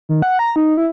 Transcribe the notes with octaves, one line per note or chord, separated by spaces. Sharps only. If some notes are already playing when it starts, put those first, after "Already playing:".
D#3
F#5
A#5
D#4
E4